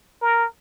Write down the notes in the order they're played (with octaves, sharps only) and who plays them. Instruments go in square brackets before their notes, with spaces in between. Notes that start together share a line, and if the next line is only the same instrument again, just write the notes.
[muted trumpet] A#4